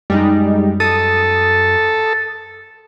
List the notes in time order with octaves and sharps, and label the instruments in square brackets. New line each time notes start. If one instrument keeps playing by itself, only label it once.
[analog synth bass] F#2 [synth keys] G3 G#3 D#4
[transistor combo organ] A4 [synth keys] D#6